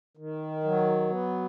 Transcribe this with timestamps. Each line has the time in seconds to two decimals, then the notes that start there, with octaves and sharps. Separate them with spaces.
0.17 D#3
0.64 F#3
1.10 B3